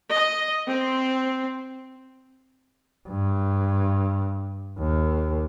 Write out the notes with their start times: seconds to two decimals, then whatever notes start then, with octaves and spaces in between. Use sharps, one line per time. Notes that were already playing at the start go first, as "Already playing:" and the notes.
0.14 D#5
0.69 C4
3.08 G2
4.79 D#2